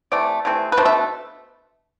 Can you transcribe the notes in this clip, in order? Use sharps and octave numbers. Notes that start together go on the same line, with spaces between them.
C3 E3 A3 D5
C3 E3 A3 C4
B4
B2 A3 D4 C5
E5